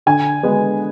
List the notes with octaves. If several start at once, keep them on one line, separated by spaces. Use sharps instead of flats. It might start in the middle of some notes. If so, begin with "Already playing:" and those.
D3 G#5
G#3 B3